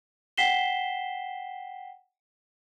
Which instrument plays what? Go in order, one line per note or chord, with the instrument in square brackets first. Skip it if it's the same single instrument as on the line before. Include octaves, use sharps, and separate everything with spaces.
[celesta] F#5 G5 B6 C7 E7 G7